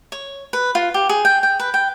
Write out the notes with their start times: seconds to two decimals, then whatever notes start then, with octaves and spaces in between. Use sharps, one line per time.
0.12 C#5
0.53 B4
0.75 F4
0.94 G4
1.09 G#4
1.25 G5
1.43 G5
1.60 B4
1.74 G5